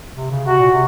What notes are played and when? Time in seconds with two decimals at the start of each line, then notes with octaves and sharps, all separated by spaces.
0.16 C3
0.31 C#3
0.44 C3 F#4
0.58 A#2
0.71 C3